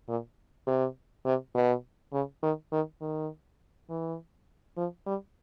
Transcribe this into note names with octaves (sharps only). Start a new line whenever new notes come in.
A#2
C3
C3
B2
C#3
D#3
D#3
D#3
E3
F3
G3